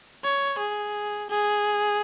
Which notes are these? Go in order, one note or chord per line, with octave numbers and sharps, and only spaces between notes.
C#5
G#4
G#4